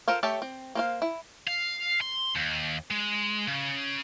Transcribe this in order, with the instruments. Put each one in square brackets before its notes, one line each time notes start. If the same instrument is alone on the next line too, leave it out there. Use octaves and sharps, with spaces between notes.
[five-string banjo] F4 A4 A#4 C5 F5
A3 G4 C#5 E5 A5
C4
A#3 C5 F5
E4
[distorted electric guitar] F5
C6
D#2
G#3
C#3